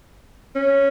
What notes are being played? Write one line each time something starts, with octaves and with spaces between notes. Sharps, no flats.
C#4